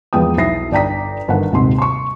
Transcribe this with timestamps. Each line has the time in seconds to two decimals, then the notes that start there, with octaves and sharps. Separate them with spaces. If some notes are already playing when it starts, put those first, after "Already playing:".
0.13 E2 F3 G#3 B3 G5 D#6
0.37 B1 E4 E5 A#6 C7
0.71 G1 D5 G5 A#5 B6
1.28 G1 D#3 F#5
1.52 D#1 G#2 C3 C4 C6
1.78 C6 C#6